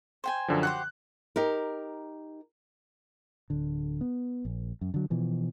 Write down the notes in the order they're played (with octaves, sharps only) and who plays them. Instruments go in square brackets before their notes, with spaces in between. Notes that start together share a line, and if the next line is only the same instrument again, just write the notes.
[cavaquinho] C5 G5 G#5
[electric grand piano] F#2 D3 F3
[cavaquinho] F#4 G4 C5 [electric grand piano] F#6
[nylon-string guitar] D#4 G4 A#4
[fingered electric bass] D1 D3
B3
A#1
F#2
D3 F#3
B2 E3 F3